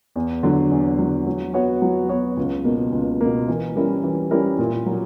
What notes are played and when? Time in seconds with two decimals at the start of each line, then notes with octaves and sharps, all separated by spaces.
0.16 E2
0.43 D3 F#3
0.71 E2
0.99 D3 F#3
1.27 F#3
1.54 B3 F#4 C#5
1.82 F#3
2.09 B3 F#4 C#5
2.37 C#2
2.64 B2 A#3
2.92 C#2
3.21 B2 A#3
3.48 E3
3.76 G3 C#4 E4 A#4
4.04 E3
4.31 G3 C#4 E4 A#4
4.59 A#2
4.86 F#3 A#3